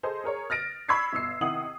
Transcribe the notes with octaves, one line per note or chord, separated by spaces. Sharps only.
G#4 A4 C5 D#5
G#4 A#4 C#5
F6 A6 A#6 D7
B5 C#6 E6 G#6 B6 C7
G1 B2 E6 C7
C3 D#3 E4 F#5 D#6 F#7